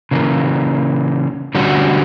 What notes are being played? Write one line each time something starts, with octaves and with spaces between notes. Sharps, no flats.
C#3 E3 A#3
D3 G3 C#4 F#4